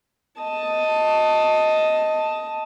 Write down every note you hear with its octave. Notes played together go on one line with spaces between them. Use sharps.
D#5 A5